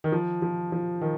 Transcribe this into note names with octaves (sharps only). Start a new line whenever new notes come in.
D#3
F3
F3
F3
D#3